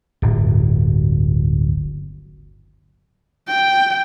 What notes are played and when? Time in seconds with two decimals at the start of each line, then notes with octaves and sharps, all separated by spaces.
0.22 D1 G1
3.48 G5